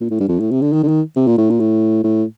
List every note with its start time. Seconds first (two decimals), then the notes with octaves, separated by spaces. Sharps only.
0.01 A#2
0.11 A2
0.20 G2
0.29 F2
0.40 A2
0.51 C3
0.62 D3
0.73 D#3
0.83 D3
0.88 D#3
1.16 C3
1.27 A#2
1.38 A2
1.50 A#2
1.60 A2
2.04 A2